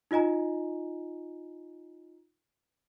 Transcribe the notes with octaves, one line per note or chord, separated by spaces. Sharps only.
D#4 F4 D#5 G#5 A#5